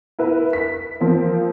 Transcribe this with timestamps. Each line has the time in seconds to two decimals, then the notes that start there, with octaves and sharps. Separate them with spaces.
0.19 E4 A#4 B4 E5
0.53 B6
1.01 F3 A#3 C4